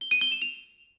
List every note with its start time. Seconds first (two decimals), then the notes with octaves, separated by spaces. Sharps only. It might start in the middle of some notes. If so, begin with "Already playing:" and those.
0.01 G7
0.11 D#7
0.21 G7
0.31 E7
0.42 F7